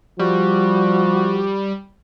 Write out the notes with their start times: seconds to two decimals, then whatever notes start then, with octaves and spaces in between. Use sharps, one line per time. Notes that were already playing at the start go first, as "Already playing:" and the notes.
0.19 F3 G3 F#4